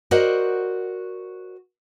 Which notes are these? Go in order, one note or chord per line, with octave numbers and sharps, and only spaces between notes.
F#4 A#4 C5 D5 D#5 F#5